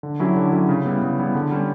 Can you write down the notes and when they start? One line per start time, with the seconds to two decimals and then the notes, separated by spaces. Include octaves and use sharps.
0.03 D3
0.20 F#3 C#4 E4 G4
0.36 D3
0.53 F#3 C#4 E4 G4
0.69 C#3
0.86 G3 B3 E4
1.02 C#3
1.19 G3 B3 E4
1.35 D3
1.51 G3 C#4